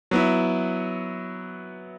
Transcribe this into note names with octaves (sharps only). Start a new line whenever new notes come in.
F#3 B3 E4